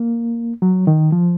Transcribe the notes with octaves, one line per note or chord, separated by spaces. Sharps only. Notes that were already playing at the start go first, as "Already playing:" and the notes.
Already playing: A#3
F#3
D#3
F3